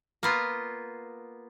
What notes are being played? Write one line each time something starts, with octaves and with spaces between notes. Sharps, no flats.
A#3 B3 F4